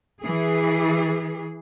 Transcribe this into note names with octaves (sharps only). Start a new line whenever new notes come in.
E3 G#4